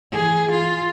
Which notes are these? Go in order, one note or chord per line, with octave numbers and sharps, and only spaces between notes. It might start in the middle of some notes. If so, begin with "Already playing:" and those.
E3 G#4
F4